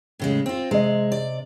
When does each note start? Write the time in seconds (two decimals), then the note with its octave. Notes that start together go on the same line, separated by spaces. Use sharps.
0.19 A2 C#3 G#3
0.46 C4 F4
0.71 C3 G#3 D#5
1.12 D5